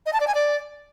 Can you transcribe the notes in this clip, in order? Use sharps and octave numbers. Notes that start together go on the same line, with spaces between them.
D#5
A5
D5
G#5
D5